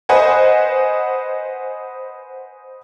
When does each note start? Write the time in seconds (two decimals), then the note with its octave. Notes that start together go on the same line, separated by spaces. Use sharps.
0.09 B4 C5 D#5 F#5 G#5